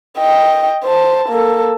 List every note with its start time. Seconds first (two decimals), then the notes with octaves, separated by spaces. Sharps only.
0.18 D#5 G5
0.84 C5 A5
1.29 A#3 A4